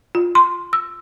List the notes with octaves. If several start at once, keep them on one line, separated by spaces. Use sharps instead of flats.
F4
C6
E6